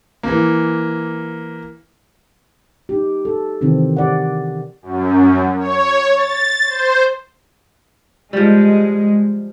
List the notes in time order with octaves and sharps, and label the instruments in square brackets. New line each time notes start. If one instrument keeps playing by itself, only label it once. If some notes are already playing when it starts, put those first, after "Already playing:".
[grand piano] E3 A#3
[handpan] D#4 G4
A4
C3 D#3 E3 C4
G4 D5 F#5
[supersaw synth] F#2
C#5
A6
C5
[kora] F3 G3 [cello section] G#3